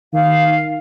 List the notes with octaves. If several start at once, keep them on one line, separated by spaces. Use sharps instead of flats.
D#3 F5